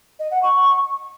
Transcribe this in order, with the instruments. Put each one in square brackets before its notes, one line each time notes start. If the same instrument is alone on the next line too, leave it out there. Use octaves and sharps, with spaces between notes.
[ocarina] D#5
F#5
C#6